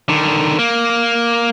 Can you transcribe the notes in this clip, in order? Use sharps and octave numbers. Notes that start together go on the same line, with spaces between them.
D3 D#3
A#3